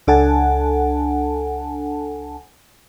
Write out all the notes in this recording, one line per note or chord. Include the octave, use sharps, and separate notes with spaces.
C#2 D4 A4 F#5 G#5 A5